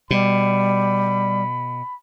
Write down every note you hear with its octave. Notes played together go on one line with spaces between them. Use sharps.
B2 G3 B5